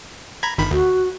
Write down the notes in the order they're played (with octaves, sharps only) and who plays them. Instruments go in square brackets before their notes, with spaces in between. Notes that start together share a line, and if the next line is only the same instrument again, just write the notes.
[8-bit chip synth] A#5 B5 G#6
G1 D#3 B5
[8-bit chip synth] D2 [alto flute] F#4